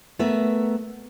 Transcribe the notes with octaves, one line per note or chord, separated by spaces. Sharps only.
A3 B3 A#4 E5